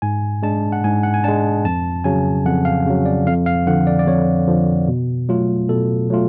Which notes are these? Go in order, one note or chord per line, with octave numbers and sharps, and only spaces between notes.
G#2 G#5
G#3 D4 A5
F#5
G#2 G#5
F#5
G#5
G#3 D4 A5
F2 A5
C#3 F#3 G#5
F2 F#5
F5
C#3 F#3
D5
F2 F5
F5
D3 F3 F#5
D5
D5
F2 C#5
D3 F3
B2
F#3 A3 F4
B2 A4
F#3 A3 F4